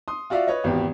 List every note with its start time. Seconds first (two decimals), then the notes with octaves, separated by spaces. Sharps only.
0.08 C6 D#6
0.30 F4 F#4 D5 E5 F5
0.48 B4 C#5 D#5
0.64 G#1 E2 B2 G4